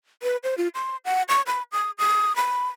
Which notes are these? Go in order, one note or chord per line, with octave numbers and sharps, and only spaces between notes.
B4
C5
F4
C6
F#5
C#6
B5
D#6
D#6
B5